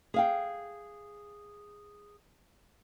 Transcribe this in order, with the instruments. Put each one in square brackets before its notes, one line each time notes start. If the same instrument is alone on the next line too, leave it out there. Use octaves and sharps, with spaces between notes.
[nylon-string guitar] G#4 F5 G5